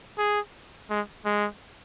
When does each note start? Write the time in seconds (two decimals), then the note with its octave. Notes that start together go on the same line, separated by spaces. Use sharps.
0.18 G#4
0.90 G#3
1.25 G#3